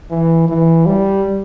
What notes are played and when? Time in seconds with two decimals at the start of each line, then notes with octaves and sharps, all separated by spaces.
0.11 E3
0.49 E3
0.86 G3